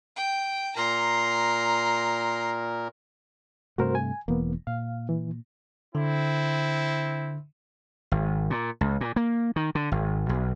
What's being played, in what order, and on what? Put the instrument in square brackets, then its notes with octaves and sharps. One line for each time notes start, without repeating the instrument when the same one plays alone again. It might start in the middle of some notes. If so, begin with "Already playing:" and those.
[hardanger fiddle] G5
[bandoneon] A#2 A#4 [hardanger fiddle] A#5 C6
[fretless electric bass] G2 C3 A3 [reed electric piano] F#4 A#4 C5
[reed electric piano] G#5
[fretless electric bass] E1 E3 [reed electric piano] A#3 B3
[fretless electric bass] A#2 [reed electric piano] F5
[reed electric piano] E3
[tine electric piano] D3 [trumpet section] C4 E4
[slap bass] G#1
A#2
C#2
A#2
A#3
D#3
D3
G#1
B1